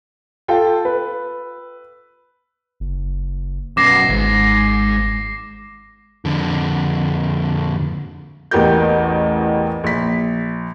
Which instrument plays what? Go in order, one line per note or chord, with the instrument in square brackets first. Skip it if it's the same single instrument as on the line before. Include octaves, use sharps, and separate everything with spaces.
[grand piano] F4 A4 G5
B4
[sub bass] F#1
[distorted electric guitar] F#2 B2 [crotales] D6 A#6 C7
[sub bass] G#1 [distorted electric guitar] D#2 G#2
[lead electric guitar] F2 D3
[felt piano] A1 E2 G4 A#4 G6
A#1 B6